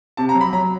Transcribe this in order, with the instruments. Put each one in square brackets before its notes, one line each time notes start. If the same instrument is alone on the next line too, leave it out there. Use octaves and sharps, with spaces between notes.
[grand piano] C3 A5
A#5
F#3
B5
F#3 A#5